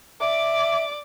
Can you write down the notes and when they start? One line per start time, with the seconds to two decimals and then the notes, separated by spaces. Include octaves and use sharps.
0.21 D5 E5 D6